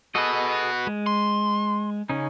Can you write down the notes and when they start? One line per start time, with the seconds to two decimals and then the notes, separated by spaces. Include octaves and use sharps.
0.15 F#4 G#4 A4 B4 D#5
0.87 G#3
1.07 C6
2.10 C#3 C#4 D#4